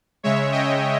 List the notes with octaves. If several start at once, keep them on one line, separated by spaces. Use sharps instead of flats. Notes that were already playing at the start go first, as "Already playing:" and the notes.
C#3 G#3 C#5 E5
D#5 G5